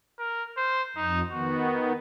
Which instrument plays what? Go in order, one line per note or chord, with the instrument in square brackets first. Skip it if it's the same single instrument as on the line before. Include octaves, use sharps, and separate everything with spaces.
[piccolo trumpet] A#4
C5
[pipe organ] F2 [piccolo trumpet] D#4
[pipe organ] D#3 B3 [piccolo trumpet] F#4